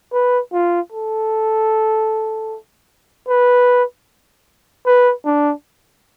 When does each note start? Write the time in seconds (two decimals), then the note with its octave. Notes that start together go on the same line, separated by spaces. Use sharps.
0.13 B4
0.53 F4
0.92 A4
3.28 B4
4.86 B4
5.25 D4